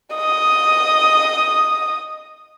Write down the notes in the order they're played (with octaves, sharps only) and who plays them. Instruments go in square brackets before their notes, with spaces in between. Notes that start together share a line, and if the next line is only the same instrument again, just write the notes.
[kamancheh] D#5 D#6